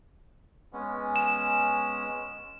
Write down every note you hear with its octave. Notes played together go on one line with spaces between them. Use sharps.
G#3 B3 C#4
E7